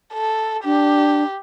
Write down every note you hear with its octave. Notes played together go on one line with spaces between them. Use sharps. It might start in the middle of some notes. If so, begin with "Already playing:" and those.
A4
D4 G4